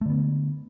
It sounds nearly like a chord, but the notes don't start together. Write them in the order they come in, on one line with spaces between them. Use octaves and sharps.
A3 D3 B3